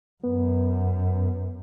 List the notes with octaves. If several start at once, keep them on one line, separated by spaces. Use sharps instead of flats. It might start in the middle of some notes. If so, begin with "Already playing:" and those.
F#2 B3